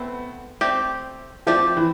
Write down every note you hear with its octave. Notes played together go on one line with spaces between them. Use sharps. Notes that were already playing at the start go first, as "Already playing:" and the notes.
Already playing: A3 B3 C4 E4
A3 C4 G4 D5
F3 A3 C4 G4 D5
E3